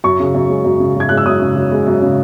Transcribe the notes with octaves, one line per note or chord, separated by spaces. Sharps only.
F#2 C#6
C#3
F#2
G#3
F#2
C#3
F#2 G#6
G#3 F#6
E6
F#2 D#6
C#3
F#2
G#3
F#2
C#3